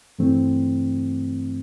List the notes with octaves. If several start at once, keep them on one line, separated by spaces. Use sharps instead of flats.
G2 E3 A3 C4